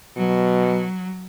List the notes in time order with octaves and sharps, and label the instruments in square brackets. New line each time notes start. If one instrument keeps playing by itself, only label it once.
[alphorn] B2 [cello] F#3